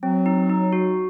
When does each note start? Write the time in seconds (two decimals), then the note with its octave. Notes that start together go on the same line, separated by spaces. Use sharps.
0.02 F#3 C4
0.26 D#4
0.49 D#4
0.73 F#4